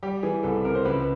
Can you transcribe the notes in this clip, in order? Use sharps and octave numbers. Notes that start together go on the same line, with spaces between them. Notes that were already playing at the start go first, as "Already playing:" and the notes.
G3 G4
E3 G#4
C2 A4
C3 A#4
C5
C#2 B4